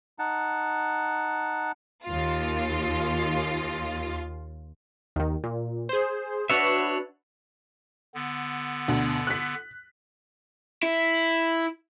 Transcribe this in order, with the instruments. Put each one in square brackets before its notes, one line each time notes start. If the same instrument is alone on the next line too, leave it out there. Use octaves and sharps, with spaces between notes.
[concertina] D#4 F#5 A5
[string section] D#2 F4
[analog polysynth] D#2 D#3
A#2
G#4 C5
[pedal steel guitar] D4 C#5 E5 [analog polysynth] F#4 B4
[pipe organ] D3 B3
[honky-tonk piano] D2 B2
F#6 B6
[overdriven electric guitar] E4